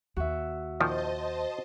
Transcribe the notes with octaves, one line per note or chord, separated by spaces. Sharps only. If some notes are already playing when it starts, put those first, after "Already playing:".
D#2 F#4 E5
A#2 D#3 F3 C5 D#5 A5